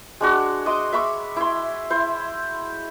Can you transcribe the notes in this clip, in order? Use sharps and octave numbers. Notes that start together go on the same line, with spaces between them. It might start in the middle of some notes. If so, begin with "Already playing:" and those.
G#3 D4 F#4
D#5 C6 D6 D#6
E5 B5 C#6 D6
E4 C6
E4 C5